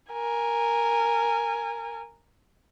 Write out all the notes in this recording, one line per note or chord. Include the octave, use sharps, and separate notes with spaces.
A#4 G#5